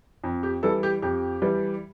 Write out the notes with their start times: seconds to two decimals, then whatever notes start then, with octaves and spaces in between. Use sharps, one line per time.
0.24 F2
0.43 G4
0.63 E3 G3 A4
0.83 G4
1.02 F2 G4
1.42 E3 G3